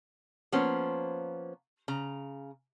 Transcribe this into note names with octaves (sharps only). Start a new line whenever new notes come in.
F3 A#3 B3 C#4 C5
C#3 A#5